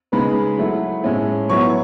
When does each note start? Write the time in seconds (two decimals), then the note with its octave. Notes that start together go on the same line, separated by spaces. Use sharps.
0.12 C#3 G#3 D#4 B4 B5
0.58 F#3 A3 E4
1.04 A2 G#3 C#4 E4
1.49 F#3 B3 E4 C#5 C#6